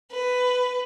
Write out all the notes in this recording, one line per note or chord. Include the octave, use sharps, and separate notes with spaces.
B4